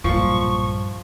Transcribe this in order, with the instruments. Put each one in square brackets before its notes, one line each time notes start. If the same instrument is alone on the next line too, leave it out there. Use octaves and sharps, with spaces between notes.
[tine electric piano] B1 A#2 [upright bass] G2 [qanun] F3 [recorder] C#6